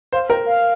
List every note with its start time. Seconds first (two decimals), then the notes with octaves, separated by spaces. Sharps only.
0.12 C5 F5
0.29 A#4 G5
0.46 F5